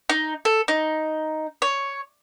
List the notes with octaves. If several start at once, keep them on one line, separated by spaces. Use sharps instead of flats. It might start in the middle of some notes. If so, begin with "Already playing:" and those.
D#4
A4
D#4
C#5